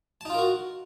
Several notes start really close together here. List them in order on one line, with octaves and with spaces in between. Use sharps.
A5 D#4 F4 A#4 F#4